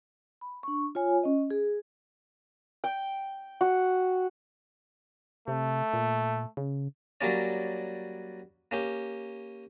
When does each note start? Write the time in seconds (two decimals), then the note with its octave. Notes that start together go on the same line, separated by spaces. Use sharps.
0.41 B5
0.63 D4 C#6
0.95 F4 C#5 G#5
1.23 C#4 D#5
1.51 G#4
2.84 G5
3.61 F#4
5.48 C3 A3
5.93 A#2
6.57 C#3
7.21 F#3 G3 A#3 C#4 D5
8.71 A#3 C#4 G4